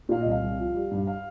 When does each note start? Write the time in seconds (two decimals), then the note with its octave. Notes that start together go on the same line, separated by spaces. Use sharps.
0.09 A#2 F5
0.20 D#5
0.26 C2
0.31 F5
0.42 C2
0.59 F3
0.74 G3
0.91 G2
1.07 F5